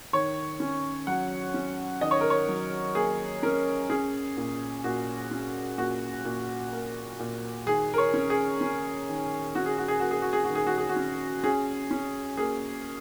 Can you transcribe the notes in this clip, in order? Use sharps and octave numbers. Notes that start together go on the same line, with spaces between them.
D#3 C#5
C#4
F#3 F#5
C#4
D#3 D#5
C#5
A#4
C#5
F#3
A#3 G#4
C#4 A#4
C#4 G#4
A#2
A#2 F#4
C#4
A#2 F#4
A#2
A#3
A#2
D#3 G#4
A#4
C#5
C#4
G#4
C#4
D#3
C#4 F#4
G#4
F#4
G#4
A#3 F#4
G#4
F#4
G#4
F#4
D#3
G#4
F#4
G#4
F#4
C#4
C#4 G#4
C#4
A#3 G#4